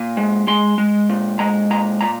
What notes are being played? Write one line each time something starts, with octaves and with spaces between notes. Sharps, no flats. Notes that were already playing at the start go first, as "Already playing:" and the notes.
Already playing: A#2
G#3
G#3 C6
G#3
A#2
G#3 A#5
A#2 A#5
A#2 A#5